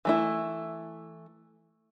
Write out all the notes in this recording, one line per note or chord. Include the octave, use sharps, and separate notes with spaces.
E3 A3 E4